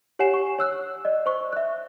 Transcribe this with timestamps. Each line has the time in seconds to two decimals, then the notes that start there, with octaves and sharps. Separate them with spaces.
0.19 G4 C#5 F#5 G#5 C7 E7
0.34 C#6
0.59 C#5 E6 F#6
1.05 D5 D#5
1.26 C5 C#6
1.53 E5 F#6